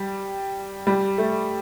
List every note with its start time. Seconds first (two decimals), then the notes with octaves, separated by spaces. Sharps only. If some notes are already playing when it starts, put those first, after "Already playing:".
Already playing: G3
0.87 G3
1.18 A3